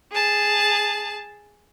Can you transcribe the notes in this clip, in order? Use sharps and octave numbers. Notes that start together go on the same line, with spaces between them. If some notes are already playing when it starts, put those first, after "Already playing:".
G#4 A5